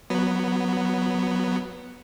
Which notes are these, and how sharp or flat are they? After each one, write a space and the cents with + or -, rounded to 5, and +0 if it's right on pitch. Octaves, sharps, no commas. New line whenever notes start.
F#3 +0 B3 +0